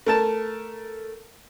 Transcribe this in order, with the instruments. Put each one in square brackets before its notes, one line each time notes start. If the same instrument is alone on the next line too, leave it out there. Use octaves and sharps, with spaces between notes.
[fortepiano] A3 A#4 A5